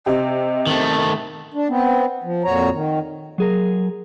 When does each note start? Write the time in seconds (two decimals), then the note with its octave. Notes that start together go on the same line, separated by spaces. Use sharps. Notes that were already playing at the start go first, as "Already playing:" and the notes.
0.06 C3 G4 D#5
0.67 D#3 A3
1.54 D4
1.69 B3 C4
2.24 F3
2.44 F2 A#2 F#4 C#5 A#5
2.72 D#3
3.38 F#3 G#4 A#4